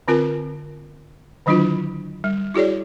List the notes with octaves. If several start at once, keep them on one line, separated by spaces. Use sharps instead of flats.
D3 C4 F4 A#4 G#5
D3 D#3 F#3 D4 E4 F4
G3
E4 F#4 G#4 C#5 D5